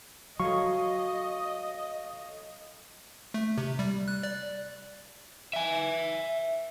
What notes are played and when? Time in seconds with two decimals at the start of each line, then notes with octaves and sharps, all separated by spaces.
0.40 F#3 A4 C#5 D#5 F5 C#6
3.34 A3
3.58 C3
3.79 G3
4.08 F#6
4.23 D5
5.53 E5 G#5